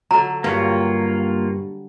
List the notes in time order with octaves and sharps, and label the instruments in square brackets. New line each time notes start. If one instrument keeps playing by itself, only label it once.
[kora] D3 F#3 [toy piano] A#5
[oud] G2 [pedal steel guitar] A#3 F4 C#5